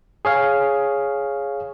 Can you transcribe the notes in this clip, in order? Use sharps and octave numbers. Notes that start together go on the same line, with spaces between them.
G#4 C#5 F5